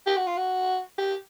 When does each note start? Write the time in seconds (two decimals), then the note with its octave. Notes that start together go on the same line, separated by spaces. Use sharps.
0.06 G4
0.17 F#4
0.27 F4
0.37 F#4
0.98 G4